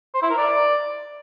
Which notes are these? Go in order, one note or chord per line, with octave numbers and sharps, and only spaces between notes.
C5
E4
A#4
D5